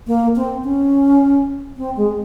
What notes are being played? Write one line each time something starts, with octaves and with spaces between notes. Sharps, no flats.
A#3
C4
C#4
C4
G#3